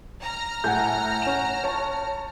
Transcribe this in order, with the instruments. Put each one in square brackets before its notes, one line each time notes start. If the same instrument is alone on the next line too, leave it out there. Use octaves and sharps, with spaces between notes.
[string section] A#5 F6
[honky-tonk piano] A2 [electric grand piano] F#5 G#5 G6
[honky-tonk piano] C#4 E7
C#5 A5